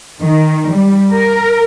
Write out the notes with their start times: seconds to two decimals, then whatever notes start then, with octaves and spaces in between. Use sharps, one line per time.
0.21 D#3
0.69 G3
1.12 A#4